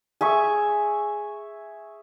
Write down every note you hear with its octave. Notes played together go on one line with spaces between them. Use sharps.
G#4 E5 C#6